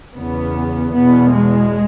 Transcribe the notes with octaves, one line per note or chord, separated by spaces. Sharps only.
E2 C#3 B3
E2 B2 B3
G#3